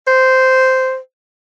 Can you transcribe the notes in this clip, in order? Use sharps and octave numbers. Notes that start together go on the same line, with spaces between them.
C5